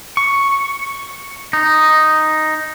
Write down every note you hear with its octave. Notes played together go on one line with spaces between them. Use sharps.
C#6
D#4